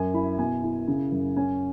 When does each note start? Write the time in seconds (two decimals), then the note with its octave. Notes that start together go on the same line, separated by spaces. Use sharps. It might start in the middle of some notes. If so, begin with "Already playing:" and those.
Already playing: F#2 G#5
0.14 E4 B5
0.38 B2 G#5
0.64 E4
0.88 C#3
1.12 F#2
1.37 C#4 G#5